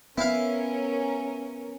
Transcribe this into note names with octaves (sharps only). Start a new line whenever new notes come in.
B3 C#4 E4 A#4 F5